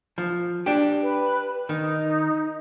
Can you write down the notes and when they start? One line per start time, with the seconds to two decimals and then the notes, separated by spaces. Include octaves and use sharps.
0.18 F3
0.66 D4 G4
1.02 B4
1.69 D#3 D#4